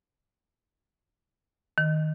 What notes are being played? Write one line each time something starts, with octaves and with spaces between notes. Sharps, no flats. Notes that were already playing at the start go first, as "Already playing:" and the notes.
D#3